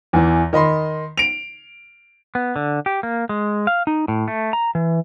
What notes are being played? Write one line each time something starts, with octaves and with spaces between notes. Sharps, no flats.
E2 E3
D#3 D#5 B5 C6
D7 F7
B3
D3
G4
A#3
G#3
F5
D#4
A2
A3
A#5
E3